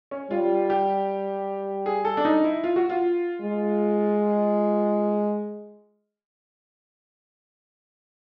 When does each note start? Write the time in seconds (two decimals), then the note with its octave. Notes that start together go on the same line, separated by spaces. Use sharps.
0.11 C#4
0.30 G3 F4
0.70 G4
1.86 G#4
2.05 A4
2.17 D4
2.25 D#4
2.44 E4
2.64 F4
2.76 F#4
2.89 F4
3.41 G#3